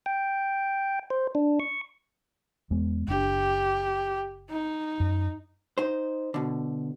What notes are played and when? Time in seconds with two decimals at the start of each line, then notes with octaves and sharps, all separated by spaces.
0.06 G5
1.10 C5
1.35 D4
1.60 C#6
2.70 E2 G#3 B3
3.08 F#1 D4 G4
4.50 D#4
5.00 F#2
5.78 D#4 C5
6.34 B2 D3